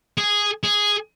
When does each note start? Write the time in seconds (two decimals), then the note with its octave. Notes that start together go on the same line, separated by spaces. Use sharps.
0.18 G#4
0.64 G#4